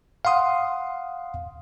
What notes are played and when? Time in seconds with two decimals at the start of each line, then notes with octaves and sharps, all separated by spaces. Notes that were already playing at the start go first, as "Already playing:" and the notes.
0.25 F5 F#5 C6 D#6